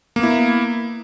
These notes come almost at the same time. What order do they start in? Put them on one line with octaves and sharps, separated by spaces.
A#3 B3 E4